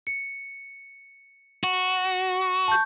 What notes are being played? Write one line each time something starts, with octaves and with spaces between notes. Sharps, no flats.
C#7
F#4
A5 C#6 G6